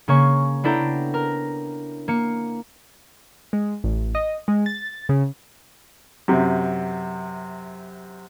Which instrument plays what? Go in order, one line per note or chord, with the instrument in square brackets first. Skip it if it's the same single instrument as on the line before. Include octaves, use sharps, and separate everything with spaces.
[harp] C#3 A#3 C#4 C#6
B3 D4 E4 A4 G5 A#5
A#4
A#3 C#7
[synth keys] G#3
A1
D#5
G#3
A6
C#3
[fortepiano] F#2 C3